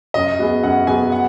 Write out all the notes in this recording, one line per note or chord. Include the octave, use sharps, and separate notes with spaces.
F#2 D#5
F#3 B3 G#4
F#2 F#5
F#3 B3 G#4 G#5
F#5